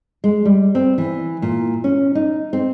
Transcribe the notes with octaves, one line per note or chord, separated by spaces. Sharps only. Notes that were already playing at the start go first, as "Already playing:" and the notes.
G#3
G3
C4
E3
A#2
C#4
D#4
C4